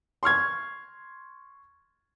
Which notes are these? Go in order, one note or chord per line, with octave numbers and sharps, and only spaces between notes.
C6 C#6 F6 G#6